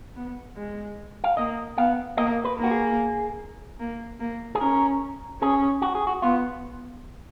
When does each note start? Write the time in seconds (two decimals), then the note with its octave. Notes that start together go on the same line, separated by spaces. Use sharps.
0.16 B3
0.57 G#3
1.24 F5
1.37 A#3 D#5
1.77 B3 F5
2.17 A#3 D#5
2.45 B4
2.59 A#3 F#4
2.71 G#4
3.80 A#3
4.20 A#3
4.55 G#4
4.60 C#4 A#4
5.41 C#4 G#4
5.82 F#4
5.95 G#4
6.07 F#4
6.22 B3 F4